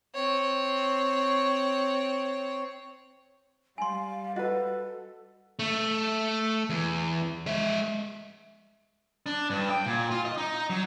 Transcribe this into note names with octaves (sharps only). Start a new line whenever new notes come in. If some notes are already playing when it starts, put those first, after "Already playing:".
C4 C#5
G3 F5 G#5 C6
F#4 A4 B4 D#5
A3
E2
G#3 E5
D4
G2
G5
A#2
F4
D#5
D#4
F#3